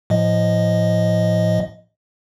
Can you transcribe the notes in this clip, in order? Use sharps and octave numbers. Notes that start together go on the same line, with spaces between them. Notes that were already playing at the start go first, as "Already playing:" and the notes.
A2 F3 D#5